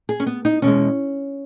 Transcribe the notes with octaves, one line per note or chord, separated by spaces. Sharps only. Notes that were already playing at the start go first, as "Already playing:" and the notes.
G#4
C#4
B3
D#4
E2 B2 G#3 C#4